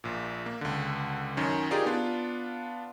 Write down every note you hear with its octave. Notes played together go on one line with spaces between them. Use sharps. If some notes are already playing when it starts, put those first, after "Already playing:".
A#1 A#2
A#3
C#2 D3
F#2 D#3 C#4
D#4 F4 G4 G#4 A#4 D5
B3 D4 F4